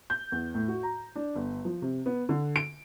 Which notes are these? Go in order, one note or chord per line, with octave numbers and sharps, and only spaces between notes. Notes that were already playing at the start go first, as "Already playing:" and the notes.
G6
E2
A2
F#4
A#5
D4
G1
F3
C3
B3
D3
D7